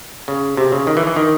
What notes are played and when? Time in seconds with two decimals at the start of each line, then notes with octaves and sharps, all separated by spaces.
0.28 C#3
0.57 C3
0.72 C#3
0.87 D#3
0.97 E3
1.07 E3
1.16 D#3